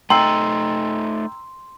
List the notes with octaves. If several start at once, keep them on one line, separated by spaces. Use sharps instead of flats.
A3 D#4 G5 A#5 C6 E6 C7